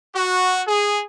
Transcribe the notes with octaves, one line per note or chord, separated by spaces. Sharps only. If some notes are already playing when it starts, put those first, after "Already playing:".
F#4
G#4